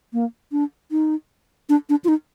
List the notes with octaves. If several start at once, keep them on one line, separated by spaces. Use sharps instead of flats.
A#3
D4
D#4
D4
D4
F4
D#4